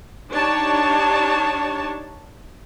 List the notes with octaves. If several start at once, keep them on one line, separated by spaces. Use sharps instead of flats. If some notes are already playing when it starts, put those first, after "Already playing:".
D4 D#4 G4 C#5 A5